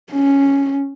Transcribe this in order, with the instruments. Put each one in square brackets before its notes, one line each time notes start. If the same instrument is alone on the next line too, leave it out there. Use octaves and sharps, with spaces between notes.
[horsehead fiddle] C#4